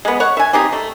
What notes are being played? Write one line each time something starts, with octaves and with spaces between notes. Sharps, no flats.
G#3 B3
C#5 F#5
E5 G#5
C4 D#4 G4 G#4
A3